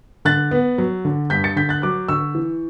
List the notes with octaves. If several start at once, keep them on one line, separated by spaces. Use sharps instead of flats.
D3 F#6 A6
B3
F#3
D3
G2 G6 B6
A6 C#7
D3 G6 B6
F#6 A6
F#3 D6 F#6
D3 C#6 E6
E3